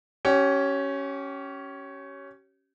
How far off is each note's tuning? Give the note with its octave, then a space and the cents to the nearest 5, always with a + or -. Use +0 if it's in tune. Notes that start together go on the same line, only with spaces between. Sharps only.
C#4 +0 G4 -35